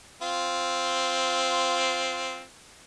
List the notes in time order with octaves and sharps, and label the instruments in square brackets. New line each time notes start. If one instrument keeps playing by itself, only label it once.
[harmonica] C4 F4